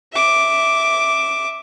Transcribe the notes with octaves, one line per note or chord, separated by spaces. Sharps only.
E5 D6